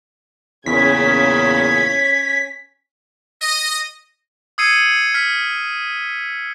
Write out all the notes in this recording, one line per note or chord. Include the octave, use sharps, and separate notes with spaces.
E2 A#2 C#3 C#4 G#6 B6
D#5
D#6 E6 G#6 C7 C#7 D#7
F6 B6